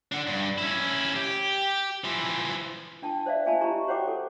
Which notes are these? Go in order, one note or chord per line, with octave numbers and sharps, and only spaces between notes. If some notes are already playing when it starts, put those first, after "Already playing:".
D4 F#5
G2
C#4 E4
G4
E3 F3
D4 G5 A5
C5 D5 E5 F5
D#5 E5 G#5 A5 B5
E4 G4 D#5 A#5 C#6
F#4 C5 C#5 F#5 G5 D6
A4